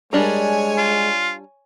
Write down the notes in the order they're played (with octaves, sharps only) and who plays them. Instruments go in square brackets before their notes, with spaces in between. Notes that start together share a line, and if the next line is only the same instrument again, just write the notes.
[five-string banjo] G3 D4 A#4 [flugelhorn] G#3 [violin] C#5 G#5
[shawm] F4